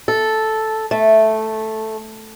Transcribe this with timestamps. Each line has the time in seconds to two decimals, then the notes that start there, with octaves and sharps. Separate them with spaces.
0.08 A4
0.91 A3